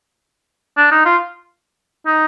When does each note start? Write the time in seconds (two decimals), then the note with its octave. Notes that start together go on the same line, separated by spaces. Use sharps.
0.78 D4
0.92 D#4
1.06 F4
2.07 D#4